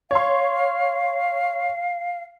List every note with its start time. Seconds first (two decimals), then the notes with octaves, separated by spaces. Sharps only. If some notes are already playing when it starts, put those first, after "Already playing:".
0.11 C#5 F5 C6